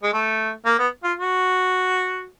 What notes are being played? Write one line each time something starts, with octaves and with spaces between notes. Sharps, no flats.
G#3
A3
A#3
B3
F4
F#4